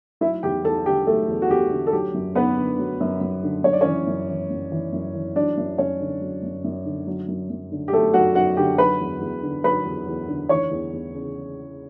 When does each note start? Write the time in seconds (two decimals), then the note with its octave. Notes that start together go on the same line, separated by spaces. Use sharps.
0.21 F#3 E4 E5
0.43 E2 G4 G5
0.64 E2 A4 A5
0.86 D3 G4 G5
1.07 F#3 A3 A4
1.28 E2
1.42 F#4
1.50 E2 G4
1.71 D3
1.87 A4
1.93 F#3 G4
2.14 F#2
2.35 F#2 B3 B4
2.57 D3
2.79 F#3
3.01 F#2
3.21 F#2
3.43 D3
3.64 F#2 C#5
3.73 D5
3.81 E3 C#4 C#5
4.07 F#2
4.29 E3
4.50 F#2
4.72 E3
4.93 F#2
5.15 E3
5.36 F#3 D4 D5
5.57 F#2
5.78 F#2 C#4 C#5
6.00 D3
6.21 F#3
6.43 F#2
6.64 F#2
6.86 D3
7.07 F#3
7.28 F#2
7.50 F#2
7.72 D3
7.88 G4
7.93 F#3 A3 A4
8.14 F#2 F#4 F#5
8.35 F#2 F#4 F#5
8.57 D3 G4 G5
8.78 F#3 B4 B5
9.00 E2
9.21 E2
9.43 D3
9.64 F#3 B4 B5
9.86 E2
10.07 E2
10.28 D3
10.49 E3 C#5 C#6
10.71 E2
10.93 E2
11.14 C#3